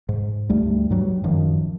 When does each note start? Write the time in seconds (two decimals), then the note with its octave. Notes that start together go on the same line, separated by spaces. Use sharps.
0.09 G#2
0.49 D2 G3 A3
0.90 G2 F#3 G3
1.24 D1 F#2 D#3 F3